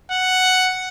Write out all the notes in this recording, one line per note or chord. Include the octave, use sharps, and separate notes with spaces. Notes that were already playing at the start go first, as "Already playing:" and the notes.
F#5